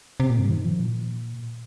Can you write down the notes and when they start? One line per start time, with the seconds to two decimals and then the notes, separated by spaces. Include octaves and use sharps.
0.20 C3
0.30 A#2
0.39 G2
0.49 D#3
0.65 F3
0.80 A#2